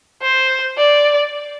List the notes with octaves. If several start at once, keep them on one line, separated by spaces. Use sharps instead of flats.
C5
D5